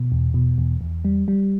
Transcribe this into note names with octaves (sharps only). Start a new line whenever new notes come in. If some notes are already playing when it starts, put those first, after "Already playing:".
Already playing: B2
E2
B2
E2
E2
G3
G3